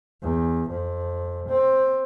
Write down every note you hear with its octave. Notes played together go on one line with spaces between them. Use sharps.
E2
F2
C4